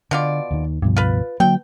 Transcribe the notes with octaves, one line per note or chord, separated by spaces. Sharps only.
B2 D3 F4 D5
D#2 D#3
C#2 G2 B2 F3
F4 B4
D3 F#3 A#3 G5